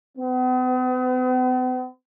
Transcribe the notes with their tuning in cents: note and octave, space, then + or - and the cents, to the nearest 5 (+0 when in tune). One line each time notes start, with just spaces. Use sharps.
B3 +45